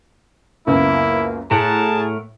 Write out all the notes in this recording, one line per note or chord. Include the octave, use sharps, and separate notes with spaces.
C#2 F#2 A#3 B3 E4
A2 A3 G#4 A#4 F#5 A5